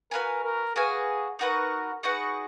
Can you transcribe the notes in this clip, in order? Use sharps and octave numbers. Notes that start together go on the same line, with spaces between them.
F#4 A#4 B4 F5 G#5
A#4
F#4 G#4 B4 F5 G#5
D#4 F#4 A#4 B4 F#5
D#4 F#4 G#4 B4 F#5